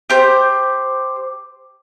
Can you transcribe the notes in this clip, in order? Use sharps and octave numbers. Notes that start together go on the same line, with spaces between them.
G4 C5 G6